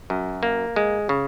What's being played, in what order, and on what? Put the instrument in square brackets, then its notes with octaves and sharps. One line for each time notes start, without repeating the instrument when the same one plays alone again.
[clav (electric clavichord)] F#2
A#3
G#3
C#3